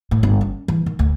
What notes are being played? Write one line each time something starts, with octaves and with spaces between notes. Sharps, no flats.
A2
G1
C#4
E3
D#3
D2